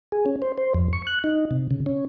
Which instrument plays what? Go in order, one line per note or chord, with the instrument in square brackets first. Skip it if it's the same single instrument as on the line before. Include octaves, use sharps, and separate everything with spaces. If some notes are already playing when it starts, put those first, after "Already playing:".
[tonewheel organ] G#4
C#4
C5
C5
F2
C#6
F#6
D#4
C3
C#3
C#4